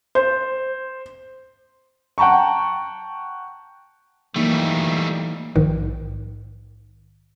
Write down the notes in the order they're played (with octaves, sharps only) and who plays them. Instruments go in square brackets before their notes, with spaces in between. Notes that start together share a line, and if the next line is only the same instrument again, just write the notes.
[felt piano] C5
[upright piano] F#5 G5 A5 A#5 C#6
[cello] E3 [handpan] F#3 A#3 D#4 [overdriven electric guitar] G3 A3
[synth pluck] A#1 G#2 D#3